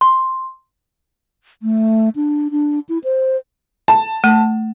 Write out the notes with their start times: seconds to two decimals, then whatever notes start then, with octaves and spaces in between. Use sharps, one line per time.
0.01 C6
1.63 A3
2.16 D4
2.51 D4
2.89 E4
3.04 C5
3.88 A5
4.24 A3